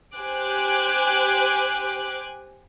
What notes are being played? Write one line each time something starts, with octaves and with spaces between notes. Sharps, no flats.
G4 C5 G#5 D6 F#6